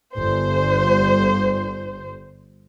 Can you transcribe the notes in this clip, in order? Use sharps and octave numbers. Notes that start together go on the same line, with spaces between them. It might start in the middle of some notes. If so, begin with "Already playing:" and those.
G1 C5